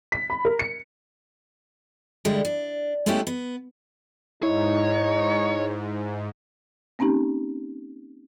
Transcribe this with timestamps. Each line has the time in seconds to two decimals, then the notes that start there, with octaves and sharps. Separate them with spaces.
0.12 B6
0.30 B5
0.45 A#4
0.59 C#7
2.25 D3 G3 G#3 E4
2.45 D4
3.06 G#3 A3 B3 C#4 E4 G4
3.27 B3
4.43 G#2 D#4 E4 C#5
6.99 A#3 C4 C#4 D#4 G4